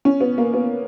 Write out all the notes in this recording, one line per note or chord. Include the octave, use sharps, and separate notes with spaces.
C#4
B3
A#3
B3